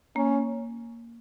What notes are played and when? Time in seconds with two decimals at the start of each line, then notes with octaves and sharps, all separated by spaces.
0.16 A#3 C#4